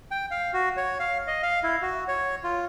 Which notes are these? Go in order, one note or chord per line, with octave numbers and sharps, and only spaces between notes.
G5
F5
F#4
C#5
F5
D#5
F5
E4
F#4
C#5
F4